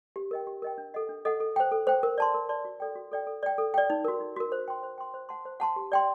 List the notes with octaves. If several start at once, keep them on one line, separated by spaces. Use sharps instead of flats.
G4
A#4 D#5 G5
G4
A#4 D#5 G5
D4
A4 D#5 F#5
D4
A4 D#5 F#5
A4
C5 G5
A4
C5 G5
A#4
D5 A5 C6
A#4
D5 A5 C6
F#4
A4 D5 G5
F#4
A4 D5 G5
A4
D5 G5
A4
D5 G5
D#4
F#4 A#4
D#4
F#4 A#4
C5
G5 C6
C5
G5 C6
C5
F#5 A5 C6
C5
F#5 A5 C6
G4
D5 G5 C6